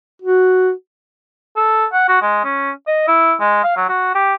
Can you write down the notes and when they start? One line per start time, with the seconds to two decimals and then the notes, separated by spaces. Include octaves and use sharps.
0.22 F#4
1.56 A4
1.93 F#5
2.08 F#4
2.22 G#3
2.44 C#4
2.87 D#5
3.08 E4
3.40 G#3
3.64 F5
3.77 F#3
3.89 F#4
4.15 G4